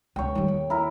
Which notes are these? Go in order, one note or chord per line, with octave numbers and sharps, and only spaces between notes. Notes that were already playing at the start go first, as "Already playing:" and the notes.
C#2 C3 C#5 G5
D#3 G3
D#2
E4 A#4